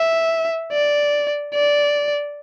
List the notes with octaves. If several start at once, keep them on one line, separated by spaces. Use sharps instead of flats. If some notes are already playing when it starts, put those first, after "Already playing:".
Already playing: E5
D5
D5